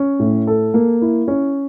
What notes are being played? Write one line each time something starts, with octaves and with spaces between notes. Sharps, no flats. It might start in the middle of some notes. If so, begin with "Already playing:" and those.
Already playing: C#4
A2
A4
A#3
E4
C#4